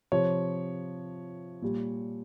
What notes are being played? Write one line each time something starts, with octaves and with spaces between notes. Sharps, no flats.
C3 F3 C#5
A#2 G3